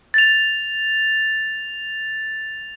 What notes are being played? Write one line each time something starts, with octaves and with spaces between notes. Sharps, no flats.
A6 F7